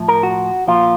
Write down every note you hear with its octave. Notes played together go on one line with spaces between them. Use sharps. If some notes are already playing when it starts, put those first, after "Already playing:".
Already playing: A2 F3
A#4
F#4
A#2 F3 F4